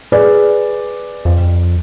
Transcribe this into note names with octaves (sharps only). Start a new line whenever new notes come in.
G#4 B4 D5
F2